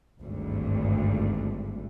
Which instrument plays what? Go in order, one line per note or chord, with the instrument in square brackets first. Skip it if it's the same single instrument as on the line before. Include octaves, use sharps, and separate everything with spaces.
[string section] G#1 D2 G2